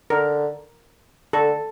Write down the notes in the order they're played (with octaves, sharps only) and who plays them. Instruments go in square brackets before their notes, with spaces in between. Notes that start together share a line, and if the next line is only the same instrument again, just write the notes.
[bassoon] D3 [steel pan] A#4
[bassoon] D3 [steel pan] A4